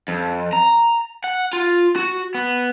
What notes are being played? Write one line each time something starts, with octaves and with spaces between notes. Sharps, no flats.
F2
A#5
F#5
F4
F#4
B3